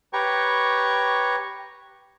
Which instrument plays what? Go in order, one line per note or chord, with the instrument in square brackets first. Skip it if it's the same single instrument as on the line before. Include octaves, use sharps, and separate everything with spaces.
[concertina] G4 B4 C#5 G5 A#5 C#6